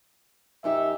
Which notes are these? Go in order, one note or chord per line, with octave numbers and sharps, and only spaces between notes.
F#2 D#4 G4 E5